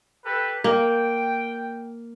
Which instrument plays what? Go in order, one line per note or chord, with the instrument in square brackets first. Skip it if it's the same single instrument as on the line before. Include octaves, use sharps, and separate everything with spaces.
[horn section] G4 A4 B4
[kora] A#3 [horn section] G5